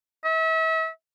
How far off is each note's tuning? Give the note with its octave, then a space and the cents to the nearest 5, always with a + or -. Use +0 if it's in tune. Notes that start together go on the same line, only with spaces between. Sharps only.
E5 -35